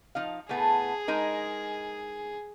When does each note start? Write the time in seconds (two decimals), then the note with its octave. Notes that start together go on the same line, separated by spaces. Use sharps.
0.15 F3 D#4 F5
0.49 A2 A3 B3 G#4
1.08 G#3 D#4 A#4